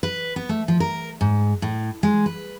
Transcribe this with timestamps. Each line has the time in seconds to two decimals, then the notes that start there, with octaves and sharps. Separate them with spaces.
0.03 B4
0.36 B3
0.49 A3
0.68 F3
0.80 A#4
1.21 G#2
1.62 A2
2.03 G#3
2.26 B4